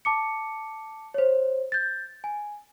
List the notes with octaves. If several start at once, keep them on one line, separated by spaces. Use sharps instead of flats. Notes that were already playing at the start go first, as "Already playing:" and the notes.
A5 D6 C#7
C5 C#5
G6 A6
G#5